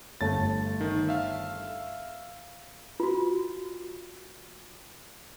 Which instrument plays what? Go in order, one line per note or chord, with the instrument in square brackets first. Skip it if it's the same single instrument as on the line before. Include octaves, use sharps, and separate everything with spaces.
[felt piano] G1 A3 A5 [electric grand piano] A6
[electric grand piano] D#3
E5 F5
[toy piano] F4 F#4